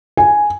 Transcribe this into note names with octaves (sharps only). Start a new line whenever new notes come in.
G#5